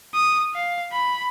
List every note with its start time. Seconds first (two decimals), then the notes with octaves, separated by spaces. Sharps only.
0.14 D#6
0.54 F5
0.92 B5